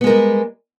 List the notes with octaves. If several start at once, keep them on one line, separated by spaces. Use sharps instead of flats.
G3 G#3 B3 A#4